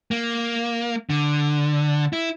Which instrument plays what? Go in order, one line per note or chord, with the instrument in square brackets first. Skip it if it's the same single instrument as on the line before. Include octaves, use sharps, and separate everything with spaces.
[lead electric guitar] A#3
D3
E4